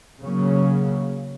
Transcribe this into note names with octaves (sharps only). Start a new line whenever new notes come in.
C#3 F#3 A#3 C#4